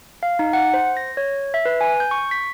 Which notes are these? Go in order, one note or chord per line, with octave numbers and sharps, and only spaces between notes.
F5
D#4
F#5
C5
A#6
C#5
E5
B4
G#5
G6
C#6
B6